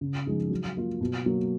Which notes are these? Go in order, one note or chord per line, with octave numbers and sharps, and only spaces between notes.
C#3
F3 G#3 D#4 G#4
F#3
A#3 F4
B2
F#3 A#3